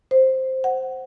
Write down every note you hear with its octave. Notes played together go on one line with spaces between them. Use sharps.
C5
F#5